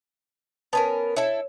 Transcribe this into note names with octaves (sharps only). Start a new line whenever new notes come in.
B3 C#4 A#4 A5
E4 A4 C#5